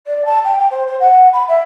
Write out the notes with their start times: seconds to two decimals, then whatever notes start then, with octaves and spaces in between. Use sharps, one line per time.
0.07 D5
0.25 A5
0.44 G5
0.58 G5
0.70 C5
0.86 C5
1.00 F#5
1.33 B5
1.48 E5